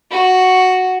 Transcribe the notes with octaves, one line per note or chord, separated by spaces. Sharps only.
F#4